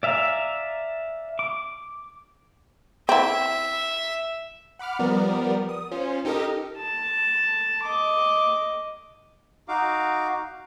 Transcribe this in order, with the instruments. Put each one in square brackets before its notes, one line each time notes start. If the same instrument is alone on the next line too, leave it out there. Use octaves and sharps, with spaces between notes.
[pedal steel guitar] D5 E5 F5 G#5 A#5
D6
[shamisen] C4 E4 [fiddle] E5
[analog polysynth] F#5 B5 D6 F6
F3 G3 B3 A#4 D5
D#6
C#4 F4 C5
D#4 G4 A4 A#4 D#5
[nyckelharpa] A5
D#5 D6
[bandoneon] D#4 F#4 F5 D6